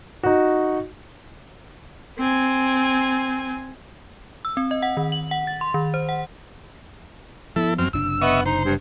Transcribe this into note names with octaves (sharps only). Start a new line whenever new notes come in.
D#4 F#4
C4 G#5
E6
C4
D#5
F#5
D#3
F#7
F#5
A6
C6
D#3
C5
F#5
F3 B3 E4 A4
F#2 C4 F6
F#1 C3 D4 E6
B3 D#5 E5 C#6
D#4 C5
G2